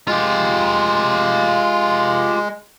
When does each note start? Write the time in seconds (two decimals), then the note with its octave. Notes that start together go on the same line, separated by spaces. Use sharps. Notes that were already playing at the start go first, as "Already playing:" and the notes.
0.08 G#3 F4 G4